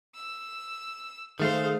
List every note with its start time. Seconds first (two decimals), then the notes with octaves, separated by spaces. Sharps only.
0.15 E6
1.40 D#3 A3 G#4 C5 F5